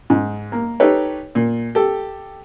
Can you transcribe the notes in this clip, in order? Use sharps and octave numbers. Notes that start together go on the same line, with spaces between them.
G#2
A#3
D#4 G4 A4 B4 C#5
A#2
G4 A4